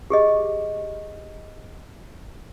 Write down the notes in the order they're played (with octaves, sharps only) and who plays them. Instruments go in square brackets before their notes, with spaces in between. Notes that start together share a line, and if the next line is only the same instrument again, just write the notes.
[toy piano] G4 G#4 D#5